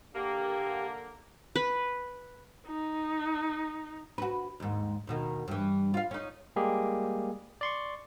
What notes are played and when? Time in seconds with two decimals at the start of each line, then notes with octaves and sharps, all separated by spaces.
0.14 D3 A#3 G4
1.56 B4
2.67 D#4
4.18 F#4 B4
4.60 D#2 G#2
5.07 D#2 B2 D#3
5.48 G2 E3
5.94 F4 F5
6.11 C#4 D#4
6.56 G3 G#3 A#3 G4 G#4
7.61 D5 C6 C#6